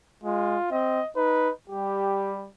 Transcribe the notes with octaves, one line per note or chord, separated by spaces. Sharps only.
G#3 F4
C4 D#5
D#4 B4
G3 G4